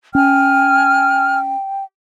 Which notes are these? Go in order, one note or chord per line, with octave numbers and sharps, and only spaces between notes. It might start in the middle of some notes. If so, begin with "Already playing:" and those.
C#4 G5 G#5 F6